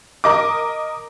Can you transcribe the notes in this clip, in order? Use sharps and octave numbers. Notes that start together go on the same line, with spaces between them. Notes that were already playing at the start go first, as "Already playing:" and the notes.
A#4 D#5 D6